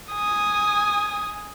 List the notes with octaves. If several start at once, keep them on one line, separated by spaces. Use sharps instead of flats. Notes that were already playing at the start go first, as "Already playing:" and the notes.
G#5 D#6